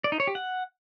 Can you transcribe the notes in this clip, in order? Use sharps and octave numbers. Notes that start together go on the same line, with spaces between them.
D5
D#4
C#5
G4
F#5